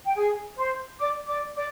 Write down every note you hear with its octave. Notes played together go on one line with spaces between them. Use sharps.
G5
G#4 G#5
C5 C6
D5 D6
D5 D6
D5 D6